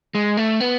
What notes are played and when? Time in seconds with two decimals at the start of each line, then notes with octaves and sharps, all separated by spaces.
0.15 G#3
0.37 A3
0.60 B3